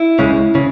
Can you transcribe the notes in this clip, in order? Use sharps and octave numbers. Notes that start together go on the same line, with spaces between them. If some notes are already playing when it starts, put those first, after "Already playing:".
Already playing: E4
C#2 C#3 G#3
C#3